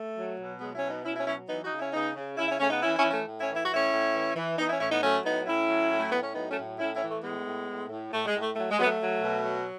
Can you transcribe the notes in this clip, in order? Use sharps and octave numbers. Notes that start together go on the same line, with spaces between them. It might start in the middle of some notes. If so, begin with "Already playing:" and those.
Already playing: A3
F#3
B2
F#3 G#3 B3
C#4 E4
B2
B3 D#4
B2 C#4 E4
C#4 E4
F#3 C#4 E4
E3 B3 D#4
D#4 F#4
C#3
C#4 E4
C#3 B3 D#4
C#3
C#3 C#4 E4
C#4 E4
C#3 A3 C#4
B3 D#4
E3 C#4 E4
C#4 E4
E3
A3 C#4
A2
C#4 E4
E3
E4
F#4
A2 C#4 E4
A2
E3
E3
E3 B3 D#4
C#4 E4
A2 C#4 E4
B3 D#4
F#3 A3 C#4
A2 B3 D#4
A2 C#4 E4
F#3
A2
A3
A2 B3
C#4
F#3 B3 D#4
A3 C#4
A2
A2 C#4 E4
C#4 E4
E3
A3
A2 G#3 B3
A2
A2
A2
A2 A3
G#3
A2
A3
F#3 A3
G#3
F#3 B3
A3
F#3
B2
F#3